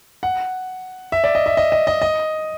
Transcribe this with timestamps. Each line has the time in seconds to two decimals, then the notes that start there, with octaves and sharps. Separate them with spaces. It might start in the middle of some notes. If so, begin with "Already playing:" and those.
0.23 F#5
1.12 E5
1.24 D5
1.35 D#5
1.46 E5
1.57 D#5
1.72 D#5
1.87 D#5
2.02 D#5